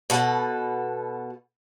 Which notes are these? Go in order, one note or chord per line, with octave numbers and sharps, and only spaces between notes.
B2 A4 F#5